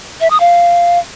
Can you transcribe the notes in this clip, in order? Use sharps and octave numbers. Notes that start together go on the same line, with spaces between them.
E5
D#6
F5